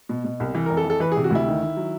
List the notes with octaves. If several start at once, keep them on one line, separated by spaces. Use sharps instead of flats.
B2
B2
C2
E3
A#4
F2
A4
E3
A4
E3 B4
G#4
C3
F#4
D2 E4
D#3
D#3
F#3